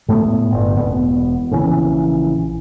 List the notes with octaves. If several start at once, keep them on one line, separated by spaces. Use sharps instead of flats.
A2 A3 B3
G1
E1 B3
A#1 C#3 E3